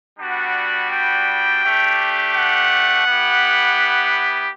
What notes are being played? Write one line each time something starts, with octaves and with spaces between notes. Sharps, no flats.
G3 B3 D4 F#4 F#5
G5
A3 D4 G4
F#5
B3 E4 G4